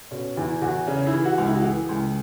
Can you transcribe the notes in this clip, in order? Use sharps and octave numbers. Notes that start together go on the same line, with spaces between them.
B2 C#4
E2 E4
E2 F#4
C#3 C#4
E4
E3
F#4
C#2
E4
F#4
E3 G#4
C#2